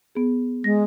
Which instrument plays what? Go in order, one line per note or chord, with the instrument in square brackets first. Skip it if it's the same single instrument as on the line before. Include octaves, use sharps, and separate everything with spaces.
[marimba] B3 G#4
[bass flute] G#3 [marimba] A#6